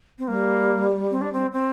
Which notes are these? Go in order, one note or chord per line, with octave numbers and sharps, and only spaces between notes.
C4
G3 A#3
C4
D4
C4
C4